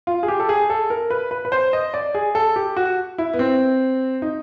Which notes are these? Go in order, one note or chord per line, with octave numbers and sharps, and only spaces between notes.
F4
G#4
G4
A4
G#4
A4
A#4
B4
B4
B4
C5
D#5
D5
G#4
A4
G4
F#4
E4
B3
C4
D#4